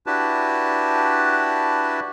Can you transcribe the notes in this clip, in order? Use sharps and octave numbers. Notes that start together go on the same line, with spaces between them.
D4 E4 F#4 G4 B4 A5